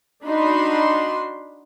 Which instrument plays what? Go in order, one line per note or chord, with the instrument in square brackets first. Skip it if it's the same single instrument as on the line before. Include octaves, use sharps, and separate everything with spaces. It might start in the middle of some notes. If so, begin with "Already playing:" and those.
[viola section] D4 D#4 F#4 B5 C6